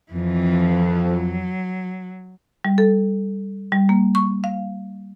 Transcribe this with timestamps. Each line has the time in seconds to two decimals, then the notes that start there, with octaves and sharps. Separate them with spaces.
0.11 F2 E3 F3
1.14 F#3
2.65 G3
2.78 A4
3.72 G3
3.89 A#3
4.15 C#6
4.44 F5